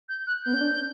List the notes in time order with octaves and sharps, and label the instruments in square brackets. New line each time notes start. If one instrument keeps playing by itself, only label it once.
[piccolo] G6
F#6
[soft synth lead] B3 [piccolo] G6
[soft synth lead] C#4
D4